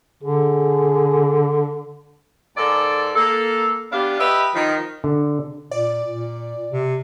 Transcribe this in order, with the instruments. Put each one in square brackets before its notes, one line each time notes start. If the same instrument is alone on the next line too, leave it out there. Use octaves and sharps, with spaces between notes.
[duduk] D3 [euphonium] G#4
[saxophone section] G#2 A4 A#4 D5
A#3 A4
B3 D4 G4 F5
G4 B4 D#5 E5
D#3 F3
[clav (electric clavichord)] D3
[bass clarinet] A#2 [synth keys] D5
[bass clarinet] A#2
C3